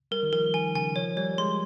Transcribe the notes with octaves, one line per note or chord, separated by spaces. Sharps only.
G3 A#4
D#3
F3 A#4
D#3 G#5
C#3 G#5
F3 C#5
G3 C#5
G#3 C6